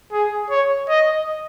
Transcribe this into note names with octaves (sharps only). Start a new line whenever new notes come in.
G#4
C#5
D#5